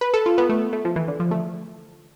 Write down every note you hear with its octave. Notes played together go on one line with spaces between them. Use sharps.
B4
A4
F4
B3
A3
A3
F3
E3
D3
F3
A3